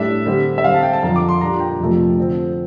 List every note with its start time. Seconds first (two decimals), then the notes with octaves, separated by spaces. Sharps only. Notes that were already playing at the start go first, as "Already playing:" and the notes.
Already playing: A2 G3 D4 E5
0.26 D3 G3 C4
0.58 E5
0.64 D3 G3 C4 F5
0.74 A5
0.83 G5
0.93 A5
1.03 F2 D3 F3 A#5
1.16 D6
1.29 C6
1.41 A#2 G3 D4 A#5
1.60 G5
1.80 F2 C3 F3 A3
2.18 D3 F3 C4